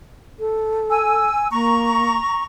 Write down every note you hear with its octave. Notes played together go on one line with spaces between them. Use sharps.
A4
G#5 E6
A#3 A#5 C#6